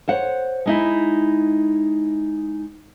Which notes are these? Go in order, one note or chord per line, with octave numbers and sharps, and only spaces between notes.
C5 C#5 F#5
G#3 D#4 E4